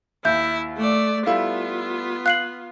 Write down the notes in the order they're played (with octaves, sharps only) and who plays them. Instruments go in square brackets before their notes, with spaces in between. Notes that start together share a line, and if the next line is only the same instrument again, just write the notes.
[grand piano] D#2 [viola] E4 [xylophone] E5 G6
[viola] A3 D5
[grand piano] G3 A3 E4 [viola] B3 F4 [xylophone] F5
[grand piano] F5 [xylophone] F#6 C7 F#7